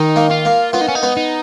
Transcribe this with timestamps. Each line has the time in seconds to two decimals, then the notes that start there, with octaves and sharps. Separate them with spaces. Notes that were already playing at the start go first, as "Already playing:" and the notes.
Already playing: D#3 D#4
0.16 A#3
0.31 F4
0.45 A#3
0.73 B3 F4
0.81 D#4
0.88 C#4
0.95 D#4
1.03 B3
1.17 D#4